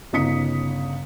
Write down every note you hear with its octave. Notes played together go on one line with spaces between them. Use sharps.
G1 C#3 D#4 D#6 B6 C#7